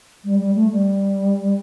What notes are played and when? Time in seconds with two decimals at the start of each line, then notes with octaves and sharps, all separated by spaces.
0.24 G3
0.40 G3
0.55 A3
0.71 G3